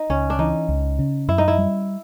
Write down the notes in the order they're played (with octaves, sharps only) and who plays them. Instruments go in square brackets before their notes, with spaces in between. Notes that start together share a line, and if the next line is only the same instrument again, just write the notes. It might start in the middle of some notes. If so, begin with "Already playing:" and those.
Already playing: [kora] D#4
[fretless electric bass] C#2 [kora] C#4
[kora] D4
[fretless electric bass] E3 [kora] D#4
[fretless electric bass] C#2
C#3
[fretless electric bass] F#2 [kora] E4
[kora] D#4
E4
[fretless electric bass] G3